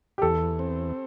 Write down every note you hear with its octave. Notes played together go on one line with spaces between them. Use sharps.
G4
E2 A4
C4